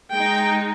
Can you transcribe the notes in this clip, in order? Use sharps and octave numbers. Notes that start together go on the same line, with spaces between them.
G#3 D#4 G5